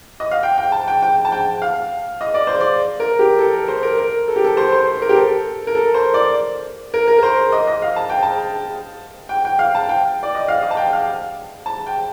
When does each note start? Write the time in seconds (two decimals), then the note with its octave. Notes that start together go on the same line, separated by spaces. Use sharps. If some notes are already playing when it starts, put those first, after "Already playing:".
0.20 D#5
0.31 F5
0.43 G5
0.58 G5
0.72 A5
0.88 G5
1.02 G5
1.25 A5
1.32 G5
1.62 F5
2.21 D#5
2.34 D5
2.47 C5
2.60 D5
3.00 A#4
3.19 G4
3.39 A4
3.53 A#4
3.68 C5
3.83 A#4
3.97 A#4
4.28 A4
4.36 G4
4.44 A4
4.57 C5
4.72 C5
4.87 C5
5.02 A#4
5.09 G4
5.16 A4
5.67 A#4
5.75 A4
5.94 C5
6.14 D5
6.94 A#4
7.08 A#4
7.19 A#4
7.23 C5
7.52 D#5
7.67 D#5
7.82 F5
7.96 A5
8.10 G5
8.23 A5
9.29 G5
9.45 G5
9.59 F5
9.75 A5
9.89 G5
10.23 D5
10.35 D#5
10.48 F5
10.62 D#5
10.71 A5
10.77 G5
10.93 F5
11.66 A5
11.87 G5